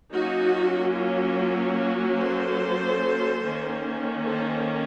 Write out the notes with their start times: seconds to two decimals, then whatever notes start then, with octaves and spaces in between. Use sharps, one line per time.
0.13 F#3 A#3 C#4 D#4 F#4
0.96 F4
1.78 F4
2.19 A4 C5
3.42 D#3 A#3 C#4
4.24 A4 C5